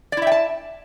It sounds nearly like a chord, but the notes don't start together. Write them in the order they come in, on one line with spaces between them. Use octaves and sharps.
D5 E4 E5 G5 A5